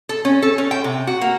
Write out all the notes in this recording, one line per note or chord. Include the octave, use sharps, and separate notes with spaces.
A4
C#4
A4
C#4
G5
C3
F#4
A#3